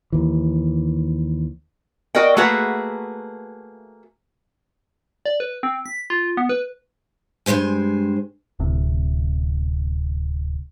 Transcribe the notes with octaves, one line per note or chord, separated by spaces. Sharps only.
D#2 E3
F#4 A#4 D5 D#5 G5
A3 A#3 F#4 G#4 B4 E5
D5
B4
C4
B6
F4
B3
B4
G2 F#3 G#3 C5 G#5
D1 C3